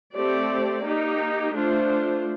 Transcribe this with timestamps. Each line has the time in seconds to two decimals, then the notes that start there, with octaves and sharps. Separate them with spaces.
0.14 A3 C4 G4 D5
0.84 A#3 D#4 G4
1.55 A3 D4 F4 C5